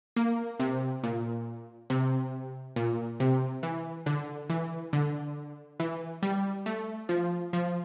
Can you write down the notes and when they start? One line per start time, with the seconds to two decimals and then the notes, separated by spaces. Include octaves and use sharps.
0.16 A#3
0.60 C3
1.03 A#2
1.90 C3
2.76 A#2
3.20 C3
3.63 E3
4.06 D3
4.50 E3
4.93 D3
5.80 E3
6.23 G3
6.66 A3
7.09 F3
7.53 F3